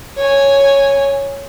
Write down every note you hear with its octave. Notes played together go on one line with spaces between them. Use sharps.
C#5 G#5